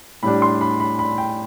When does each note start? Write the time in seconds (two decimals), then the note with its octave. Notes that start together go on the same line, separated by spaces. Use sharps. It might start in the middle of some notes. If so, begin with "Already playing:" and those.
0.23 A2 G3 D4 B5
0.42 C6
0.61 B5
0.80 B5
0.99 B5
1.18 G5